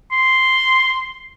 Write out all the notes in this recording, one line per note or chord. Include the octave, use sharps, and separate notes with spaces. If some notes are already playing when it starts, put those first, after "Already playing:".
C6